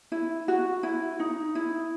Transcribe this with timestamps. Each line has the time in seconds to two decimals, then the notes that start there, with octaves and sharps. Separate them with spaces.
0.12 E4
0.48 F#4
0.83 E4
1.20 D#4
1.55 E4